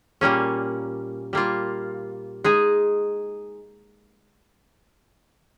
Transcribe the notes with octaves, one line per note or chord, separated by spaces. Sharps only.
A#2 G3 A#3 C#4
G3 A#3 F4
G#3 D#4 G#4